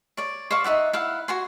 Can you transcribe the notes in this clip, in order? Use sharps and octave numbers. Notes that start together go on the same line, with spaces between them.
C#5 D5
C5 D5 F5 C#6
D#4 F#4 E5 F#5
E4 F5 F#5
F#4 G#5 C6